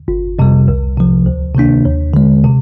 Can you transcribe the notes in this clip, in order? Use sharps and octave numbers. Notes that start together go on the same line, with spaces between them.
G1
F2 C3 G3
C2
C3 F3
D2
C3 D#3 A#3 D4
D#2
D3 G#3
C3